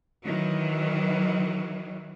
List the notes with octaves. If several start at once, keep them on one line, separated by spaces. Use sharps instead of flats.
D#3 E3 F#3